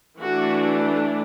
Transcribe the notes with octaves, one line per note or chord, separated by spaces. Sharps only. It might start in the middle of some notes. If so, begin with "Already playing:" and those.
E3 A3 D4 F#4